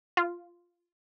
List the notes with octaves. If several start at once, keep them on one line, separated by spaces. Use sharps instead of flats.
F4